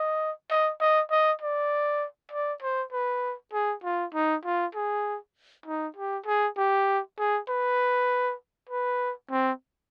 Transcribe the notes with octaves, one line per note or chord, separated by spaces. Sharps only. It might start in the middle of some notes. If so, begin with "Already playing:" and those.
Already playing: D#5
D#5
D#5
D#5
D5
D5
C5
B4
G#4
F4
D#4
F4
G#4
D#4
G4
G#4
G4
G#4
B4
B4
C4